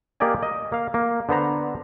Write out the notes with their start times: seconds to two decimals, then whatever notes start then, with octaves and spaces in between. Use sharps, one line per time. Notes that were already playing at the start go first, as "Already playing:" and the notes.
0.20 A#3 G4 A#4 D5 D#5 G#5
0.43 D#5
0.72 A#3 F5
0.94 A#3
1.29 D3 B3 C5 A#5